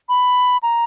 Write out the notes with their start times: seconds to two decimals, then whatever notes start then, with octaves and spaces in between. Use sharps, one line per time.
0.09 B5
0.63 A#5